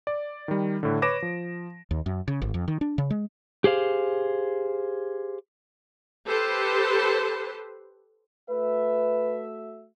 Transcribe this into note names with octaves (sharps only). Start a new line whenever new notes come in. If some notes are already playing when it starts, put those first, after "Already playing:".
D5
D#3 G3
A2 D3
B4 C#5 D6 A#6 D7 E7
F3
D#2
F#2
C#3
G#1
F2
D#3
D4
C#3
G#3
G4 G#4 C5 F5
G4 A4 B4 C5
A3 F#4 B4 E5